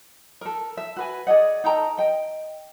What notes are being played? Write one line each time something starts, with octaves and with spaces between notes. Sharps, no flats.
A4 A#4
E5
F#4 B4 G#5
G#4 D5 D#5 F#5
D#4 A4 G5 A#5
D#5 G5